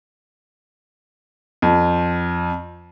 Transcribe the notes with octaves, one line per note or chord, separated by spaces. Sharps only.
F2